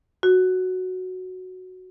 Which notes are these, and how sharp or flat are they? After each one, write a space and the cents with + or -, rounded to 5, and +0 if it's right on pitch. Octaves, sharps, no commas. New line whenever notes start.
F#4 -5